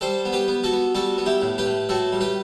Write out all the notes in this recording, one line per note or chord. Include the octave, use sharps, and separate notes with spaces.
G3 A4 C5
B3
G4 B4
B3
F#4 A4
B3
G3 F#4 A4
B3
E4 G4
A2
G4 B4
A2
A2 F#4 A4
G3
G4 B4